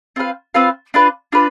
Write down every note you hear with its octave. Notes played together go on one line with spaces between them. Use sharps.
C4 F4 B4 F5
C4 F4 B4 F5
D4 F4 B4
D4 F4 B4